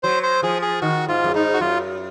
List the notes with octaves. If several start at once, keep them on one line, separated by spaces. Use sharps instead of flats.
F#3 C5
C5
F3 G#4
G#4
D#3 F#4
G#2 F4
F#2
G#2 D#4
F#4
F#2 F4